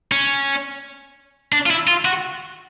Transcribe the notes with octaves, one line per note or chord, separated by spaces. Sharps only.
C#4
D4
F4
E4
F4
F#4